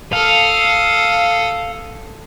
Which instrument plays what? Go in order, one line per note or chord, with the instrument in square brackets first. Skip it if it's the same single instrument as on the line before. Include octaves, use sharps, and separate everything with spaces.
[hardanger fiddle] A4 D#6 [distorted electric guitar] F5